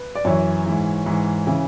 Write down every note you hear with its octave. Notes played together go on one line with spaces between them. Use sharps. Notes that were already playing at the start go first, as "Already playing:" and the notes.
Already playing: B4
D5
F#2 E3 C#5
G#2 E3
G#2 E3
C#3 E3